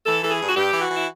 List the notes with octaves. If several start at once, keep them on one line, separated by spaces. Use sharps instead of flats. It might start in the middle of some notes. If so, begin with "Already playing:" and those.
E3 A4
E3 A4
G#4
G2
F#4
G2 G4
E3
F#4
E3 E4